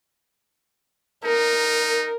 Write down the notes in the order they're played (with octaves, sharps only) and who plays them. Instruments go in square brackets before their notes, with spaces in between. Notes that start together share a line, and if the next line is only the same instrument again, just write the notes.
[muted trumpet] D#4 [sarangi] A#4